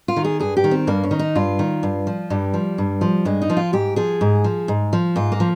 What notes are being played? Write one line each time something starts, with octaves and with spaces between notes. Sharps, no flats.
F4
D#3
G#4
G2 G#4
G4
D#3
C4
G2 A#3
C#4
D#3
D#4
G2 F4
D#3
G2
F3
G2 G3
F3
G2
F3
G2 G#3
D#4
F3
F4
G#2 G4
F3 G#4
G#2
F3
G#2
F3
G#2 F4
A#3
F3